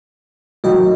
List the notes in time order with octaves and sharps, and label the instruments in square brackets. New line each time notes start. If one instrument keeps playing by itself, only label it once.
[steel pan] D#3 F#3 A3 [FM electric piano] F#4 D#5 G5